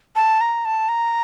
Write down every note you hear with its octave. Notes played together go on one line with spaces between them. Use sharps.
A5
A#5
A5
A#5